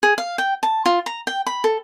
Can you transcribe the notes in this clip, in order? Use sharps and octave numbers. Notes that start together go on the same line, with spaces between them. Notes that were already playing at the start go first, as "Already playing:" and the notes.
G#4
F5
G5
A5
F4
A#5
G5
B5
A4